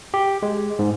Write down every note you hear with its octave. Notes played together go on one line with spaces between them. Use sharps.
G4
G#3
G#2